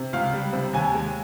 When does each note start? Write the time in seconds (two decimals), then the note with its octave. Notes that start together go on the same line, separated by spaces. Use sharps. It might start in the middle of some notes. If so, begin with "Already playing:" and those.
Already playing: C3
0.13 C#2 F5
0.33 G3
0.53 C3
0.73 D#2 G#5
0.94 G#3